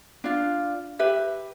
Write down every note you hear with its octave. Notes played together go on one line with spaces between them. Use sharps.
D4 F4
G4 B4 E5